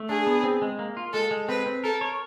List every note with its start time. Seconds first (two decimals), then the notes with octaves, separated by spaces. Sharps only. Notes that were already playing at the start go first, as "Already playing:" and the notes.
Already playing: A3
0.09 D4 G#4
0.27 B3
0.43 C4
0.62 G#3
0.79 A#3
0.97 F4
1.13 G#3 A4
1.31 G#3
1.48 C4 B4
1.66 C4
1.84 A4 A#4
2.01 C#5